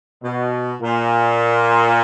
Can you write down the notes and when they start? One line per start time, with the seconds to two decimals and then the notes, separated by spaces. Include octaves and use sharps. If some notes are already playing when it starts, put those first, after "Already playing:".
0.23 B2
0.81 A#2